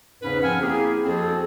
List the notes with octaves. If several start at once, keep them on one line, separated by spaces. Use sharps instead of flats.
E2 G#2 C#3 C#4 B4
F#2 F3 C4 F#5 G#5 F6
A#3 C4 E4 G4 G#4
F2 F3 C4 F#4 G#4 A4